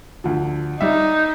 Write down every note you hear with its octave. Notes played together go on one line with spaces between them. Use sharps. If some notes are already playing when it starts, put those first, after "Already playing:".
D2 F3
G3 D#4 E5